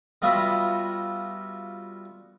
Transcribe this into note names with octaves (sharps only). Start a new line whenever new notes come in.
G3 B3 F4 F#4 D#5 E5